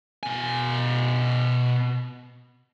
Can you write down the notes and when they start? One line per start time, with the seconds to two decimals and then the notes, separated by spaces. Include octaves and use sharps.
0.23 B2 G#5